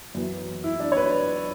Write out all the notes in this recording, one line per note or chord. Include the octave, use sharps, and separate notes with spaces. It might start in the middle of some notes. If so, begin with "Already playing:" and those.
F#2 E3 B3
E4
D4
C#5
B4